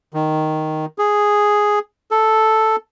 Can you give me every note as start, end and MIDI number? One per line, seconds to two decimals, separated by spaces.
0.14 0.85 51
0.98 1.79 68
2.11 2.76 69